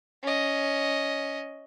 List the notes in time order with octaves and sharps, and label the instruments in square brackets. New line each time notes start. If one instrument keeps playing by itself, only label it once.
[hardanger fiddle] C#4 D#5